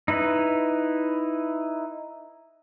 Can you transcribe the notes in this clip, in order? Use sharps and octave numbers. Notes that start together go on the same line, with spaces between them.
D#4 E4 B4